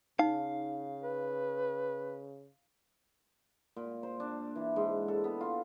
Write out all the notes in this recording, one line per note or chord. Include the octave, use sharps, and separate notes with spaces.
C#3 D#4 F5
B4
A#2
C5
D4
E3
G#2
A4
B3
F4